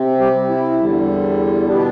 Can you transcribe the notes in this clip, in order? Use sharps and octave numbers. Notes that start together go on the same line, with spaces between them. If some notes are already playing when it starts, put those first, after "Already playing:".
Already playing: C3 C4
G3 G4
E4
E2 D3 G3
B2 G3 B3 D4